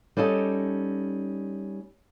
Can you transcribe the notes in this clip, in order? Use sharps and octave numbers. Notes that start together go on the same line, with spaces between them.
G3 C#4 D#4 A4 D#5